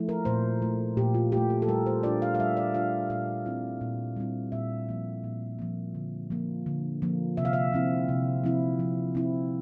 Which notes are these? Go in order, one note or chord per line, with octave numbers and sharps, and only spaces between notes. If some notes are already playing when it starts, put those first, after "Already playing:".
Already playing: F3 A3 E4
A#4
A#2 C5
A3 E4
A#2 G4
F4
A3 E4 G4
A4
A4
G3 A#4
C5
D4 F4 D5
F5
F5
G3 E5
D5
D4 F4 F5
A#2 F5
G3 C4 E4
A#2
G3 C4 E4
A#2 E5
F3 A#3
A#2
F3 A#3
D3
F3 A#3
D3
F3 A#3
C3 E5
F5
E5
F3 C4 E4
C3
F3 C4 E4
F3
C4 E4